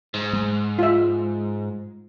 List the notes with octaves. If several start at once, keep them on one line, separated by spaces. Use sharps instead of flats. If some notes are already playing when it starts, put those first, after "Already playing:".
G#2
G#3
F4 E5